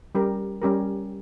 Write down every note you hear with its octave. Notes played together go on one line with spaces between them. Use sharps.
G3 C#4 G4 A#4
G3 C#4 G4 A#4